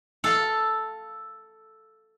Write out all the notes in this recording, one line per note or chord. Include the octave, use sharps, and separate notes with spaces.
A4 F5